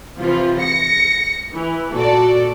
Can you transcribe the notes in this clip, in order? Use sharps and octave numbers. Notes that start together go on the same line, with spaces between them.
C3 E3 F3 F4
A#6 C#7
E3
A#2 F#4 A4 D5